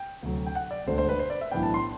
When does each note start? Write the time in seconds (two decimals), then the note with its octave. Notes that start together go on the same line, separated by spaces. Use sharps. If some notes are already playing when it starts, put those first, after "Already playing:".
Already playing: G5
0.23 D2 C3 F#3
0.47 G5
0.55 F#5
0.71 D5
0.87 E1 D2 D3 A3 D4 C5
0.98 C5
1.09 B4
1.19 C5
1.30 D5
1.41 E5
1.51 B1 A2 E3 B3 D4 G5
1.63 A5
1.74 C6